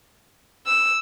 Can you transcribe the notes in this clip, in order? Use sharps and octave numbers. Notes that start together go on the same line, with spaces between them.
E6